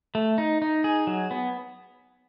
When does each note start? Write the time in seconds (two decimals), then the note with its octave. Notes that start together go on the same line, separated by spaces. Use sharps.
0.15 A3
0.38 D#4
0.62 D#4
0.84 G#4
1.07 F#3
1.31 B3